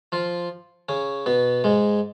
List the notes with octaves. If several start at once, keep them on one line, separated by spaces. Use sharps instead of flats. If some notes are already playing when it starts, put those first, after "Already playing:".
F3 F4
C#3 C#4
B2 B3
G#2 G#3